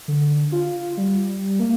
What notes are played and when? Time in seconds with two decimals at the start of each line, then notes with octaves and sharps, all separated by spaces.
0.08 D3
0.52 F4
0.97 G3
1.60 A#3